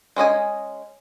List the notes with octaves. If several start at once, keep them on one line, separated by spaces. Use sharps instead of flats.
G#3 C#4 D#5 G#5